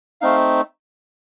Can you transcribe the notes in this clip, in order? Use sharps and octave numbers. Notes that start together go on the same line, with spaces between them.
A3 C4 D#4 F5